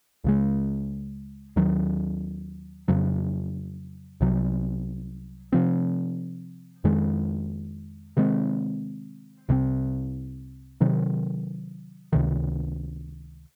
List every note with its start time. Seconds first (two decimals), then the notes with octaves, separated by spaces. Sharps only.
0.24 C#2 C#3 G#3
1.56 D#2 D#3 F#3
2.88 F2 C#3 F#3
4.21 C2 C3 F#3
5.53 C3 F3 C4
6.84 F2 D#3 G#3
8.17 C3 D#3 G#3 C4
9.49 C2 C3 F#3 C4
10.81 C3 D#3 F#3
12.13 C#2 C3 D#3